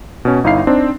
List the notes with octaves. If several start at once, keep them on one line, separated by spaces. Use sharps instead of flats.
B2 C#4
G1 D#4 E4 F5 C7
C4 D4 D#4